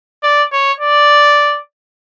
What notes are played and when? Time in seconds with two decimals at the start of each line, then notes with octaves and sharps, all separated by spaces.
0.23 D5
0.52 C#5
0.80 D5